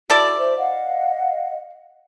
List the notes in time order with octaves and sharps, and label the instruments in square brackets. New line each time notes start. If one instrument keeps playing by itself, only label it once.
[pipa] E4 A4 D5 [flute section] F#4
[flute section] C5 E5
D#5 F5 F#5